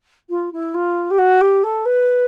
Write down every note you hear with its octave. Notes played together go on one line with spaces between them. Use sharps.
F4
E4
F4
G4
F#4
G4
A4
B4